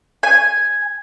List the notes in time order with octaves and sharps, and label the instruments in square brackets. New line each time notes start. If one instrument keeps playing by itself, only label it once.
[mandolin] G#5